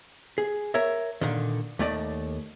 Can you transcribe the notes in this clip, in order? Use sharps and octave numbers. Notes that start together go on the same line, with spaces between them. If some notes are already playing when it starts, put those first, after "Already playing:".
G#4
A#4 C#5 E5
A#2 D3 D#3
D#2 A3 D5 D#5